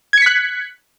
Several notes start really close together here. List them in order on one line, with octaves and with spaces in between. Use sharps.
G#6 C#7 B6 F#6